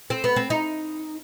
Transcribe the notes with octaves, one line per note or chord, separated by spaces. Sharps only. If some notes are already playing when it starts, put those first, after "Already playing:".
C4
B3
C4
D#4